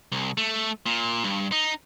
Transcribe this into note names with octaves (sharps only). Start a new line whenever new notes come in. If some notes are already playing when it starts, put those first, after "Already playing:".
C2
A3
A#2
G2
D#4